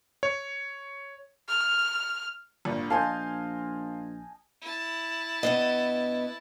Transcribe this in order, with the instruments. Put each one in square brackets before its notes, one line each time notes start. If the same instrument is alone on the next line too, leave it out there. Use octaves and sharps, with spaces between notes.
[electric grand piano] C#5
[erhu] F6
[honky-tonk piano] G#1 G2 [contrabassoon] A#2
[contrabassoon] A#1 [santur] D#5 G#5 A5 [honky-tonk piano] F5 C6 G6
[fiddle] E4 A5
[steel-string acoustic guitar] G2 B3 D#5